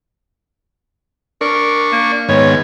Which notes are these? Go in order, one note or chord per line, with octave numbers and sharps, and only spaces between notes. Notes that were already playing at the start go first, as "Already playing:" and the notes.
D4 A#4 C#6
A#3
G#2 D#3 B3 C#5